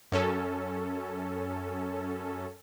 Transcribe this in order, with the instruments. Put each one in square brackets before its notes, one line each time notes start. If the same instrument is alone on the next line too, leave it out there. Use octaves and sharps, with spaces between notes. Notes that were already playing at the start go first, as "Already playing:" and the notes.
[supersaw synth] F#2 C#4 A4